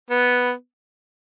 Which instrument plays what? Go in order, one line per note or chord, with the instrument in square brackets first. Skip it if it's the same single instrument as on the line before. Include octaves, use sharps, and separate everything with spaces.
[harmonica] B3